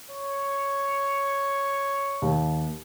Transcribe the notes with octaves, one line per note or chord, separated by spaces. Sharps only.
C#5
D#2